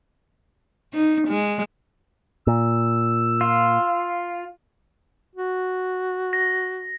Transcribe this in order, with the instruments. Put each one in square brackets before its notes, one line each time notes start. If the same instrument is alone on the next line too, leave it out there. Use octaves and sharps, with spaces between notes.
[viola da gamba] D#4
G#3
[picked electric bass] A#2 [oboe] E6
[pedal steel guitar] F4
[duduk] F#4
[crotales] A#6